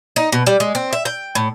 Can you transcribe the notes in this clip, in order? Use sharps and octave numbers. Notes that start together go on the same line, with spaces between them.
D#4
B2
G3
G#3
C4
E5
G5
A2